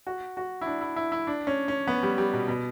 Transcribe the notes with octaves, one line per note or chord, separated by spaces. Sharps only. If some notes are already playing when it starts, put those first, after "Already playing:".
F#4
F#4
E4
D4
E4
E4
E4
D4
C#4
C#4
B3
G3
G3
B2
B2